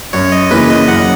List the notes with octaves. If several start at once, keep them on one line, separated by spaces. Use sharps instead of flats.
F#2 C#5
D#5
C#3 E3 A#3 B4
D#5
F#2 F#5